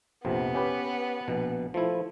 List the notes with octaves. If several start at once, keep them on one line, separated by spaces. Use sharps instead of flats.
A#1 F2 C3 B3
C#4 G4 B4
A#1 B2
F3 A3 E4